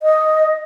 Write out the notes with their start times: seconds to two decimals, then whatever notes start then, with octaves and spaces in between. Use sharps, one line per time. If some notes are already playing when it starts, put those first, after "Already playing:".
0.03 D#5